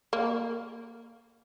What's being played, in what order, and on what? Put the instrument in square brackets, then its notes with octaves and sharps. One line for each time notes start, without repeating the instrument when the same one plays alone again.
[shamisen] A#3